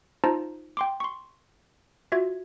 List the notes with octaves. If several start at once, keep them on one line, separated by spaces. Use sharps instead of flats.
D#4 F4 C5 A5 A#5
G5 C6 D6
C6 C#6
F4 F#4 E5 G#6